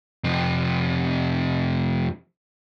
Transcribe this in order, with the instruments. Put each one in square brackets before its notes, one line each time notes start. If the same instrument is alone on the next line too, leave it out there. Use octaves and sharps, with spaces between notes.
[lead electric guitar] F2 C3